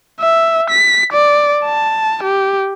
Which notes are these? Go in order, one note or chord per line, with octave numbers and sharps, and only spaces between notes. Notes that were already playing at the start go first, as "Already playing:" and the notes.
E5
B6
D5
A5
G4